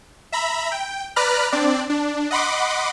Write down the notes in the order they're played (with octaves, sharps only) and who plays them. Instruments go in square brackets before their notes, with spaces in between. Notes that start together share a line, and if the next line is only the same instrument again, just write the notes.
[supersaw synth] E5 A#5 B5
G5
B4 D5 A#5 B5 F6 F#6
C4 D4 D5
D4
D#5 F#5 B5 C6 D6